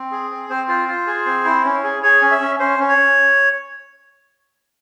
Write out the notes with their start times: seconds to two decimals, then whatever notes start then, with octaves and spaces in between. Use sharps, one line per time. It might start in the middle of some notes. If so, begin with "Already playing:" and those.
Already playing: C4
0.12 G#4
0.31 C4
0.50 C4 C5
0.68 F4 C5
0.88 F4
1.07 G#4
1.26 C4
1.45 E4
1.64 C#4
1.84 G#4
2.03 G#4 C#5
2.21 C#4
2.31 E5
2.42 C#4
2.59 C#4 C5
2.79 C#4
2.89 C#5